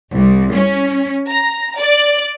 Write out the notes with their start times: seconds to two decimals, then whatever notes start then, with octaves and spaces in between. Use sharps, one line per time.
0.11 C2
0.51 C#4
1.28 A#5
1.78 D5